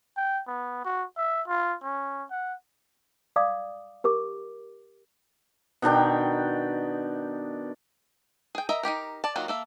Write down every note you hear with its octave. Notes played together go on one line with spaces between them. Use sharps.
G5
B3
F#4
E5
F4
C#4
F#5
D5 F5 D6 D#6
G4 A#4 D6
B2 D#3 D4 G5
G#4 G5
A#4 D#5 E5 A#5
D#4 F4 G4 A#4
D5 A5
D#3 F#3 A#3 F4 F#4
A#3 A4 E5